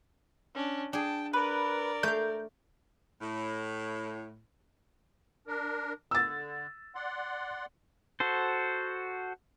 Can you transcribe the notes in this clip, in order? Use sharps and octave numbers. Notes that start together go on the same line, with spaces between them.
C#4 D4
D4 G#4 G5 A5
A#4 B4 D5
A3 F5 G6
A2
D4 A#4
D3 E6 A6
D5 F#5 C6
F#4 A4 C5